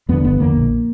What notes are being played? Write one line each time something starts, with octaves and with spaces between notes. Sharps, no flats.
F2 D3 B3
G1 B3
F2 D3 A#3
A#1